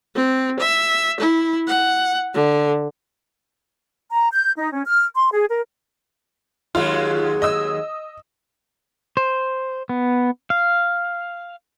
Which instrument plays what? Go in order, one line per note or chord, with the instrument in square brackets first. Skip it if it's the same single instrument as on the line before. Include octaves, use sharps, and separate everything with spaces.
[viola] C4
E5
E4
F#5
D3
[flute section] A#5
G6
D#4
C#4
F6
C6
G#4
A#4
[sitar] D#2 F#3 G#3 [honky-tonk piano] F4
[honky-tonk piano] D#5 D#6 E6
[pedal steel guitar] C5
B3
F5